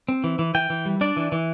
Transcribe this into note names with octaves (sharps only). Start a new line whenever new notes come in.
C4
E3
E3
E3 G5
E3
G3
D4 D5
E3
E3